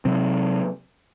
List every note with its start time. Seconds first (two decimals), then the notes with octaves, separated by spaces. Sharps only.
0.05 C3 F#3 C4